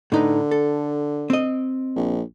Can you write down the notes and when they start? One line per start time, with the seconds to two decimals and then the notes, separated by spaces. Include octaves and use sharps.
0.12 A2 D3 D#4 B4
0.51 A4
1.30 C4 D#5
1.96 A#1